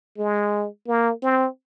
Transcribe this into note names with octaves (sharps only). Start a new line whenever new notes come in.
G#3
A#3
C4